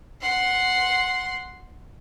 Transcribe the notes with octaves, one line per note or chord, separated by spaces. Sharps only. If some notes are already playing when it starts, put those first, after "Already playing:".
F#5 C6